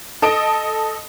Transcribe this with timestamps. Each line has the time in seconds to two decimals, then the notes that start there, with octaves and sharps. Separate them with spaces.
0.22 A4 D#5 D#6 D7